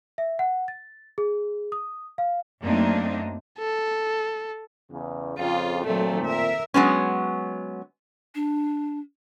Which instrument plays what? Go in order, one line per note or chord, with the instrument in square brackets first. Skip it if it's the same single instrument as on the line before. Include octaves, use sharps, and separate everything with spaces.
[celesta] E5
F#5
A6
G#4
D#6
F5
[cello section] F#2 A3 A#3 C4 D4 D#4
[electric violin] A4
[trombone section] E2 C#3
[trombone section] F2 C#3 [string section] F4
[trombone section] A#2 C4 [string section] D#3 F#3 A3
[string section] A#4 E5
[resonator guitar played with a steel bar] F#3 G#3 B3 C#4
[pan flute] D4